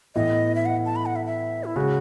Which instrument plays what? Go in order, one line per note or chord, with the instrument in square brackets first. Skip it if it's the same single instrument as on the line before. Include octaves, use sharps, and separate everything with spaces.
[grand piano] A2 E3 B3 E4 [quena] D#5
[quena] E5
F#5
A5
B5
F#5
E5
E5
E4
[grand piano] C#3 G#3 [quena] F#4